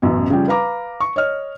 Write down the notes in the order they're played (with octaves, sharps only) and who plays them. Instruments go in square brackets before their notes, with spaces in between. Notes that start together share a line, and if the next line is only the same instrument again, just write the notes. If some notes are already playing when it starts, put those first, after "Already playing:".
[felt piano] A1 F#2 B2
C#3 F3 G3 G4
B4 F5 A#5 D6
C#6
C#5 D#5 F6